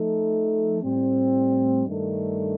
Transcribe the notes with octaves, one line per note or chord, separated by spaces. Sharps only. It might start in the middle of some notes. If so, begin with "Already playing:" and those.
Already playing: F3 A3 D#4 A4
A2 G3 C4
G2 D#3 A3 D4 A4